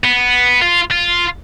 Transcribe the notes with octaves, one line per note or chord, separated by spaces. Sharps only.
B3
F4
F4